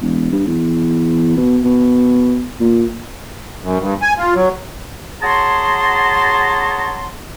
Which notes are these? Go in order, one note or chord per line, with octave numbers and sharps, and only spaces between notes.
E1
G2
E2
B2
B2
A#2
F#2
G2
G#5
F4
F#3
F#4 G#4 C#5 A5 A#5 C6